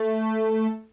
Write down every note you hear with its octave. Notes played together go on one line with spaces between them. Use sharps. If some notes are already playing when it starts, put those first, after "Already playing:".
Already playing: A3